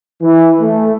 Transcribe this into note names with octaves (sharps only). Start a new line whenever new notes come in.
E3
A3